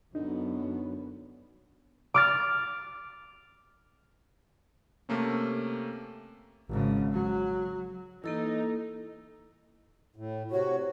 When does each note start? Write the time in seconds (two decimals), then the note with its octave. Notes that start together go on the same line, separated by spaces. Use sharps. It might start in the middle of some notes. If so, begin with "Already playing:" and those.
0.15 F#2 D3 B3 D#4
2.14 D6 F6 A6
5.09 C3 A3 A#3 C#4
6.69 G#1 C#3
7.13 F#3
8.24 E3 A#3 D#4 A4 E6
10.16 A2
10.52 C3 F#4 C#5